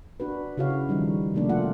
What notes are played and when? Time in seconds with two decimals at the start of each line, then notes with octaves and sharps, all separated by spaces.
0.20 D4 F#4 B4
0.57 C#3 E4 F#4 C#5 F5
0.89 D#3 F3 G3 D#4
1.34 C3 F3 A3 A#3 D4
1.49 F4 A4 F#5